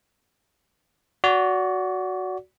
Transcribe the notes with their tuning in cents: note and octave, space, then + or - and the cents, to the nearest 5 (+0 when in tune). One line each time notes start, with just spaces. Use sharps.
F#4 +0 D5 -30